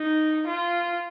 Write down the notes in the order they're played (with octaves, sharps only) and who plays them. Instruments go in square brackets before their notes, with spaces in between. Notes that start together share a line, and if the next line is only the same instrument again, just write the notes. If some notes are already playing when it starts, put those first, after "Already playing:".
Already playing: [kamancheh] D#4
F4